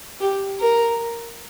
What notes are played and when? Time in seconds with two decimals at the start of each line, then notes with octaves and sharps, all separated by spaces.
0.21 G4
0.61 A#4